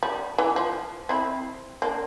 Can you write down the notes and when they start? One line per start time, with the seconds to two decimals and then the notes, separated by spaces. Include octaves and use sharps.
0.03 G3
0.38 E3
0.56 F3
1.09 C4 E4
1.82 A#3 D4